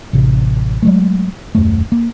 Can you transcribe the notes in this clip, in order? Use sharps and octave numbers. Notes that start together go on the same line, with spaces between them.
A1 C3
F#3 G#3 A3
D#1 F#2 A3
A#3